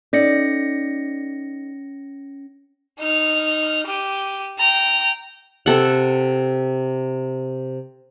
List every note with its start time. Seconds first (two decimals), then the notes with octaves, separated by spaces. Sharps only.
0.13 C#4 D#4 A4 D5 A#6 C#7
2.99 D#4 F6
3.87 G4 D#7
4.58 G5 A#5
5.66 C3 A4 F#5